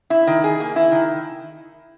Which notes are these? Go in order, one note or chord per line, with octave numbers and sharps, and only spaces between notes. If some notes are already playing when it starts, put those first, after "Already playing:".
E4
D#3
G#4
A#3
E4
D#3